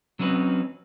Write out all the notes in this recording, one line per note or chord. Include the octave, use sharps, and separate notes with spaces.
F#3 C4 C#4 D#4 B4